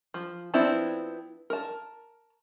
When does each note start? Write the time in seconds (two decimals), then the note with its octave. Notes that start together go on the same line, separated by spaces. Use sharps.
0.14 F3
0.54 F3 B3 C4 D4 E4
1.50 A#4 A5